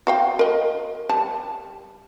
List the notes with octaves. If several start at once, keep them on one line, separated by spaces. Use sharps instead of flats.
F#4 F5 G5
A#4 D#5
G3 A5